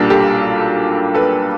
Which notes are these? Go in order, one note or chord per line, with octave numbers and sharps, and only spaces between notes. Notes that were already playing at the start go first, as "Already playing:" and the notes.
Already playing: B1 A#2 G3 A#3 D4 G4 A4
G4 A4
A4 B4